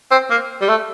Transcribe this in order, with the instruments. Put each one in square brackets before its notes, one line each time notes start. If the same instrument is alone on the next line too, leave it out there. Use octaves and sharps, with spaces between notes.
[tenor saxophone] C4
A#3
G3
A3